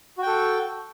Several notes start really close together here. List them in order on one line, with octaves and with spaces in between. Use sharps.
F#4 G5 A4